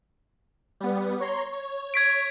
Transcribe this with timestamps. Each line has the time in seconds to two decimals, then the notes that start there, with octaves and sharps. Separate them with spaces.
0.80 G3 B3
1.20 C#5 A#5 C6
1.52 C#5
1.94 G#6 B6 D7